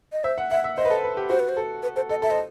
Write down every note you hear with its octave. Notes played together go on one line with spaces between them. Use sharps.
D#5
C5 E5
F#5
E5 F#5
E5
C5 D#5
B4
A4
B4
G4
F#4 C5
B4
C5
A4
B4
A4 C5
A4 D#5
A4 E5
C5 D#5